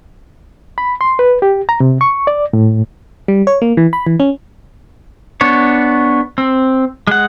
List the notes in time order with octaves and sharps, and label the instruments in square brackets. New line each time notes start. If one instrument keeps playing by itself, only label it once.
[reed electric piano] B5
C6
B4
G4
A#5
C3
C#6
D5
A2
[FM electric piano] G3
C#5
A#3
E3
B5
E3
C#4
[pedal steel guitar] B3 D4 C#5
C4
G#3 F#5